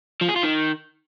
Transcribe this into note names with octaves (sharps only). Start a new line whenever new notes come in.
F3
G#4
F4
D#3